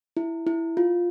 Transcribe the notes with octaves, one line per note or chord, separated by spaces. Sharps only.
E4
E4
F4